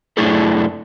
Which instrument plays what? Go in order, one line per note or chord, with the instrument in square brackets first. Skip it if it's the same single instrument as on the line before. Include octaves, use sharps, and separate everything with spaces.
[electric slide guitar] F#2 A3 D4 E4 G#4 A4